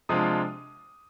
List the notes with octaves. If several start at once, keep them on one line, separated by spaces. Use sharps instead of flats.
C3 F3 G#3 D4 F4 D#6